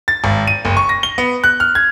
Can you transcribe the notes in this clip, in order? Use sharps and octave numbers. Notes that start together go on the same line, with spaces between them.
A6
G#1
D#7
F#1
C#6
A#6
G7
B3
F#6
F6
G#6